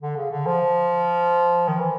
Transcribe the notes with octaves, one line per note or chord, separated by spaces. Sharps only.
D3
C#3
D3
F3
D#3
E3